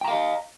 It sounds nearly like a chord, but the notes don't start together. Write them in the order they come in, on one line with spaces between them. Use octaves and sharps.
G5 A#5 F5 D#5